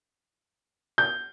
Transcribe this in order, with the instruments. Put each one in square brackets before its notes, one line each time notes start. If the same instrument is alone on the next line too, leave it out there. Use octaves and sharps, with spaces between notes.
[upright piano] G6